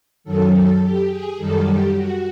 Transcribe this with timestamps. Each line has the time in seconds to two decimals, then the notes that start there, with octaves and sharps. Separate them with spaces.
0.24 F#2 D#3 F#3 A4
0.52 A4
0.81 G4
1.09 G#4
1.37 F#2 D#3 G3 A4
1.65 G4
1.93 F#4